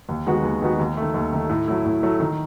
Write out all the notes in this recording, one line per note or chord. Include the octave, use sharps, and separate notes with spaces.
D#2
D#3 G#3 B3 F#4
D#2
D#3 G#3 B3 F#4
D#2
D#3 A3
D#2
D#3 A3
A2
F#3 A3 E4
A2
F#3 A3 E4
D#3